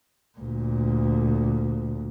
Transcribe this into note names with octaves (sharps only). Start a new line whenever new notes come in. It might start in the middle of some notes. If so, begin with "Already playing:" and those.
D2 A#2